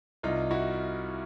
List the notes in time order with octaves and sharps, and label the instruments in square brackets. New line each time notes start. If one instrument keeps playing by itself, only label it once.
[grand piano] C2 D#4 F4
E4 F#4